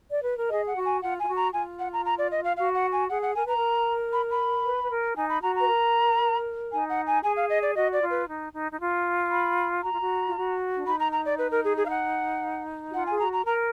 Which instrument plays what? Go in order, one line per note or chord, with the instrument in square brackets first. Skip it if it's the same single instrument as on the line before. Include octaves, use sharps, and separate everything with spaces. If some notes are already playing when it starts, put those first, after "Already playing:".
[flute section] D5
B4
A#4
[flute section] G#4 [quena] D#5
[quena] F#5
[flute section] F#4
[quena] G#5
[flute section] F4 [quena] F#5
[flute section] F4 [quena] G#5
[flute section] F#4
[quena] A#5
[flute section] F4 [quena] G#5
[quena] F#5
A#5
A#5
D5
D#5
F5
[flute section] F#4 [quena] F5
[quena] F#5
G#5
[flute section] G#4 [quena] F#5
[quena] F#5
[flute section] A#4 [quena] G#5
[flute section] B4 [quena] A#5
[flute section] A#4
[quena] B5
B5
[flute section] B4
B4
A#4
[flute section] D#4 [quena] G#5
[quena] B5
[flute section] F#4 [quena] A#5
[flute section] B4 [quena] A#5
[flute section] A#4
[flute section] D#4 [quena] G#5
[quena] F#5
G#5
[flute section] G#4 [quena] G#5
[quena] F5
D#5
D5
[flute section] F#4 [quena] D#5
[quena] D5
[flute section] F4
[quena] B4
[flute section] D#4
D#4
D#4
F4
[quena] B5
[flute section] F#4 [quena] A#5
[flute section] F4
F#4
F4
F#4
D4
[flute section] D#4 [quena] B5
[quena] A#5
A#5
D5
B4
A#4
G#4
G#4
F5
F#5
[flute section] F#4
[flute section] F4 [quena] F#5
[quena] G#5
[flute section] G#4
[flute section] F#4 [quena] A#5
[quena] A#5
[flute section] A#4 [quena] A#5